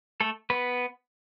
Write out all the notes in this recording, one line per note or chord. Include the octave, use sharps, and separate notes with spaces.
A3 A4
B3 B4